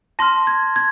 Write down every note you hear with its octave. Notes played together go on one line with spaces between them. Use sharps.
A5 C6 F6 A#6
G#6
G#6